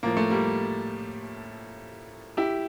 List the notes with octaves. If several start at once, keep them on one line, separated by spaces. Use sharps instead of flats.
A2 F3 A#3
A3
G3 A#3
E4 G4